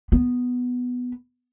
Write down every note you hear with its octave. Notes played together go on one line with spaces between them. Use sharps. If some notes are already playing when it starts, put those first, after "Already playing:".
B3